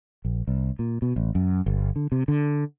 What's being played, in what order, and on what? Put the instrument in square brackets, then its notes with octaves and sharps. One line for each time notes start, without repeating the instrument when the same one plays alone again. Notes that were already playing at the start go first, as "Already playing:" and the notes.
[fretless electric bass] A#1
C2
A#2
B2
A1
F#2
G1
D3
C3
D3